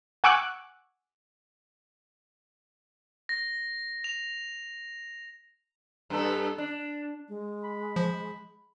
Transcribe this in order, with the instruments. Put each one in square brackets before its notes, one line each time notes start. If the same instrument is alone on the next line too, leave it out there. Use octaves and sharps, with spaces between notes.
[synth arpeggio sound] F#5 G#5 C#6 D6 E6 F#6
[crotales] A#6
F7
[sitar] G2 B3 A4
D4
[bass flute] G#3
[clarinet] B5
[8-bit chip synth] F3